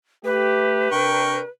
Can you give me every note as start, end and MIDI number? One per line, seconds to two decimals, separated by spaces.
0.25 0.92 57
0.25 0.92 67
0.25 1.48 71
0.92 1.40 48
0.92 1.40 62
0.92 1.40 70
0.92 1.37 79
0.92 1.37 85